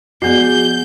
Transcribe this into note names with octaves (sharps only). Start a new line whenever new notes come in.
F3 B3 F#4 G#4 D5 G6